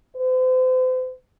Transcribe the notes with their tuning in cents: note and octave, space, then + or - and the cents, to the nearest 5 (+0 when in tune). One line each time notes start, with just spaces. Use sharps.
C5 -40